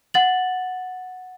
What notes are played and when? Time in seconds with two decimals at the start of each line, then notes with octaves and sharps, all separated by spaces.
0.14 F#5 A6 F#7